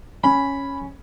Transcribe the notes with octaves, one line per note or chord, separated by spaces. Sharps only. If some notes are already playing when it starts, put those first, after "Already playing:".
C#4 B5